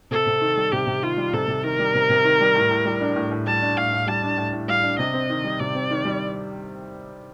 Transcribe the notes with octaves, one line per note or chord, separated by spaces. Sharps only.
C3 A4
C3
D#3
G3
C3 G4
C3
D#3 F4
G3
C3 A4
C3
D#3 A#4
G3
C3
C3
D#3
G3
A2
A2
G3
D4
A2
A2
G3 A5
D4
A2 F5
A2
G3 A5
D4
A2
A2
G3 F5
D4
C3 D#5
C4
D#3
G3
C3 D5
C4
D#3
G3